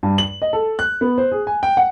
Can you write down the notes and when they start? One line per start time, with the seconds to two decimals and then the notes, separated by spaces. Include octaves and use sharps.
0.03 G2
0.18 F#7
0.42 D#5
0.53 A4
0.79 F#6
1.01 B3
1.18 C5
1.32 G#4
1.47 G#5
1.63 G5
1.77 F#5